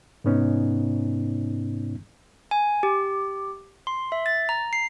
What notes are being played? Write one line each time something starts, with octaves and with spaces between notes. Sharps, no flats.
G#2 C3 B3 C#4 D#4
G#5
G4
C6
E5
A6
A#5
C7